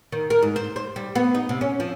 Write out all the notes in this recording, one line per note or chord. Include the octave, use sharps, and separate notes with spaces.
D#3
A#4
G#2
C5
C5
G3
B3
D#4
C3
C#4
F3